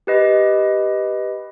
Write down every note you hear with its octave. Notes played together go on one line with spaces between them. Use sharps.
G4 B4 D#5